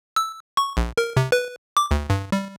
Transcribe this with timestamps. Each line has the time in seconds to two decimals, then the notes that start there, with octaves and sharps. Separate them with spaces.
0.16 E6
0.57 C#6
0.77 A#1
0.98 A#4
1.17 C3
1.32 B4
1.77 D6
1.91 D2
2.10 G2
2.32 G3